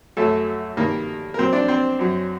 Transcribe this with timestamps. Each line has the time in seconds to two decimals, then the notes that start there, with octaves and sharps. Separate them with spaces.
0.17 F#2 F#3 A3 A4
0.77 G2 D#3 G3 A#3 A#4
1.34 A#4
1.38 A#2 F#3 C4 C5
1.53 D4 D5
1.68 C4 C5
1.99 F#2 F#3